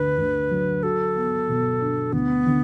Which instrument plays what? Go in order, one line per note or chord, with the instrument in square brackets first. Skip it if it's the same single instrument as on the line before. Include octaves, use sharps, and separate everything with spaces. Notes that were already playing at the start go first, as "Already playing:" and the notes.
Already playing: [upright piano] D2 D3 [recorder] B4
[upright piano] D2
F#3
[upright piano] F#4 [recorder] A4
[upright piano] B3
B2
D4
[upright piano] D2 [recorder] B3
[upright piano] D3